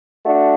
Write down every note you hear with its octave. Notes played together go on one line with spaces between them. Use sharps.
A3 D4 F#4